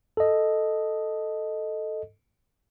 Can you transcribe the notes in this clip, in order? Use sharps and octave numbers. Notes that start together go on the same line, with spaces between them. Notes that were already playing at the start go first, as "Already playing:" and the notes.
A4 D#5